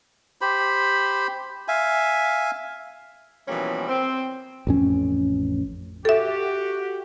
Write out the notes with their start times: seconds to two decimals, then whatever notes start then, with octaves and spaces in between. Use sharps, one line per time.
0.41 G4 C5 B5
1.68 E5 F5 G#5
3.48 B2 E3 F3 G3 A#3 C#4
3.89 C4
4.67 A1 F2 C#4
6.05 F#4 G4 A4 E5